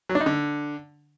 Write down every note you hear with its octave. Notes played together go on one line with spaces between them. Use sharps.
F#3
D4
D#4
D3